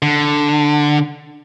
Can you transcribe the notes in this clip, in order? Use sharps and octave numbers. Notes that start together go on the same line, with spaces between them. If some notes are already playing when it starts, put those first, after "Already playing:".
D3